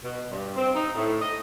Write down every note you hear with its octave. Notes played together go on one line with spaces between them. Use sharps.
B2
G2
C4
D#4
A2
D#5